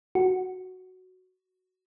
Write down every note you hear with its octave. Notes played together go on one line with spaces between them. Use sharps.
F#4